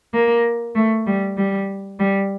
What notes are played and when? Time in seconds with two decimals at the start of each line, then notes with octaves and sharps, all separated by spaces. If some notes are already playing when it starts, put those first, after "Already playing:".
0.14 A#3
0.75 A3
1.07 G3
1.37 G3
1.99 G3